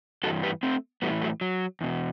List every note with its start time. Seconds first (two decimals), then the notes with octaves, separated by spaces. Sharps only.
0.23 G2 E3 F#4 A4
0.43 G4 B4
0.63 A3 C4
1.02 A2 E3 G3 B3
1.22 F#3 A3
1.41 F#3
1.81 E2 B2